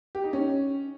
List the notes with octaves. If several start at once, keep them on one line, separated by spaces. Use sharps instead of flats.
G4
D#4
C#4